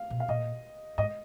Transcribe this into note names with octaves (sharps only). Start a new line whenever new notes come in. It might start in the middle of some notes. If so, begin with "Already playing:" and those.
Already playing: F5
B2
F5
A#2 D#5
G#2 D#5